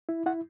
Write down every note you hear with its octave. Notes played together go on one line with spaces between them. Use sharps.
E4
E4 F#5